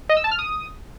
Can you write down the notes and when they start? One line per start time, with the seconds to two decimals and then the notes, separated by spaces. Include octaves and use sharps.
0.09 D#5
0.17 E6
0.24 A5
0.31 F6
0.39 D#6